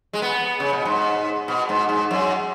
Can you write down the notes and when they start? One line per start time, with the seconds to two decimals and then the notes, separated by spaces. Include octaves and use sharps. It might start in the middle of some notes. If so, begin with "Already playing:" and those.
0.13 G#3
0.22 B3
0.60 C#3
0.73 B2
0.85 G#2
1.48 B2
1.69 G#2
1.89 G#2
2.11 F#2